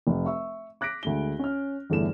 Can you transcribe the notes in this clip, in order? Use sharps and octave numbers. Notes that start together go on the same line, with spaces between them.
F1
E5 C#6 E6
D6 F#6 A#6 B6 D7
D2 G#3 G7
C#4 F6
G1 E2 A3 E7